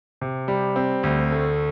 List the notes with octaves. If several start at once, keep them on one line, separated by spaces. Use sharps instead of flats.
C3
G3
C4
D2
A3